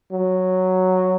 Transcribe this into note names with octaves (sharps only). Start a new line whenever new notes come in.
F#3